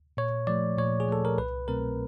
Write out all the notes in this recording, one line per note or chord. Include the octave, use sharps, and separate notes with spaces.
A#2 C#5
F3 A3 D5
A#2 C#5
G#4
F3 A3 A4
A#4
C2 B4
B2 F#3 A3 C4 A#4